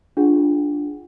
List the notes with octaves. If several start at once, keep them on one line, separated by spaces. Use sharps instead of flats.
D4 F4 G#4 F#5